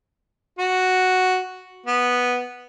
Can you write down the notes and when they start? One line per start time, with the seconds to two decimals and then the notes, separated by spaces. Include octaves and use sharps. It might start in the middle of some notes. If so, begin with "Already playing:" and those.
0.59 F#4
1.87 B3